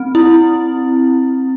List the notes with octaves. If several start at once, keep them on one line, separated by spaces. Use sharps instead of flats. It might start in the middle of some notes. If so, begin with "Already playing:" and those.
Already playing: C4
E4